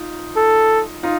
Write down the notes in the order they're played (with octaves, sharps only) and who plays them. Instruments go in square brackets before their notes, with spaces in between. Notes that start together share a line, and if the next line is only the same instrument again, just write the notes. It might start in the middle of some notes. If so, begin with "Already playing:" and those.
Already playing: [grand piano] D#4 F4
[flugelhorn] A4
[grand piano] D#4 F4